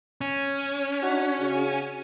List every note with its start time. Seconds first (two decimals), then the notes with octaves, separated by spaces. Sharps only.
0.21 C#4
1.02 D4 D#4 F#4
1.40 C#3 F#4 G#4